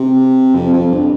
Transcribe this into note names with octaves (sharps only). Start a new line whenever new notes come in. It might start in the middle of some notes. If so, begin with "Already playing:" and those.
Already playing: C3
F2
F2
G2